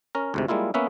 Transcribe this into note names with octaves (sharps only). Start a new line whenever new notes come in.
C#4 A#4
D2 G#2 C3
G3 G#3 A#3 E4 F4
A#3 B3 C#4 E5 F#5